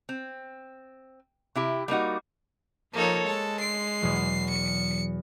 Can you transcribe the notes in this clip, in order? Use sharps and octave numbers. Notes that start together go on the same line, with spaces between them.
C4
C3 E4 G4
G3 A#3 D#4 F#4
F3 A#3 D#4 A4 C#5
G#3 A4
C6 C7 D7
E2 B2 F#3
C#7